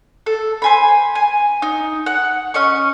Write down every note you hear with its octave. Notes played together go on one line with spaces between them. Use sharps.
A4
C5 G#5 B5
G#5
D#4
F#5
C#4 D#5 C#6